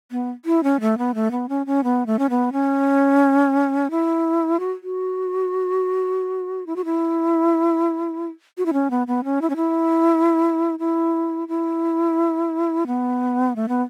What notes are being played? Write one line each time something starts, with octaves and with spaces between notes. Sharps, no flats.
B3
E4
C#4
A3
B3
A3
B3
C#4
C#4
B3
A3
C#4
B3
C#4
E4
F#4
F#4
E4
F#4
E4
F#4
E4
C#4
B3
B3
C#4
E4
C#4
E4
E4
E4
B3
A3
B3